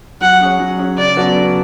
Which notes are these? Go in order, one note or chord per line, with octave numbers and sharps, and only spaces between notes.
F#3 F#5
C#4 G#4 C#5
F#3
C#4 G#4 C#5
C#3 D5
F#3 B3 F#4 A4
C#3